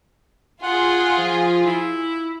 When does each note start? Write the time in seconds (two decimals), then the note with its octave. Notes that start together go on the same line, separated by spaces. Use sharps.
0.63 F4 G#4 F#5
1.18 F3
1.66 E4